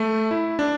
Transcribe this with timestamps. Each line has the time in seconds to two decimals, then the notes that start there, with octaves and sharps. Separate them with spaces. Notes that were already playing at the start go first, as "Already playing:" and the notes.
Already playing: A3
0.31 E4
0.59 D4